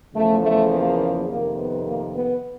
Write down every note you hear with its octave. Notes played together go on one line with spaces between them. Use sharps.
E2 C#3 F3 A3
A3
A#3
F2 C3 D#3 A#3
B3
A#3
B3